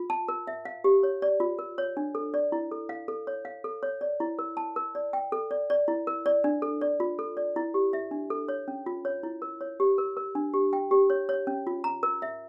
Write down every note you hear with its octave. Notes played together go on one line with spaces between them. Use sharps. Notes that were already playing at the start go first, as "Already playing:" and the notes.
Already playing: F4
A5
A#4
E5
F5
G4
C#5
D5
F4
A#4
C#5
D4
A4
D5
E4
A4
F5
A4
C#5
F5
A4
C#5
D5
E4
A#4
A5
A#4
D5
G5
A4
D5
D5
E4
A#4
D5
D4
A4
D5
F4
A4
D5
E4
G4
E5
D4
A4
C#5
C#4
F4
C#5
E4
A#4
C#5
G4
A#4
A#4
D4
G4
G5
G4
C#5
C#5
C#4
F4
A#5
A#4
E5